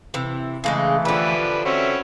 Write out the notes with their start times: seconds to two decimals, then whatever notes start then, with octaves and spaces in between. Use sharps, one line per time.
0.14 C3 E3
0.64 C#3 E3 G#3 A3 D#4
1.05 D3 F3 D4 G4 B4
1.65 C4 C#4 F#4 E5